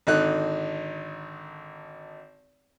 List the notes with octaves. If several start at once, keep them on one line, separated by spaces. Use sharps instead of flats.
G#1 D3 D#4 F#6